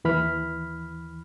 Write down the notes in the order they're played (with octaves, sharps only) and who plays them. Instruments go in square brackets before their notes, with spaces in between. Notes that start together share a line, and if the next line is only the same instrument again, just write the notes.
[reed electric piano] D#2 E3 B5 F6